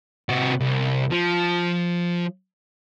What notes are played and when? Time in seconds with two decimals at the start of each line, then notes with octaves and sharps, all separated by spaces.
0.29 C3 F#4
0.60 C2
1.11 F3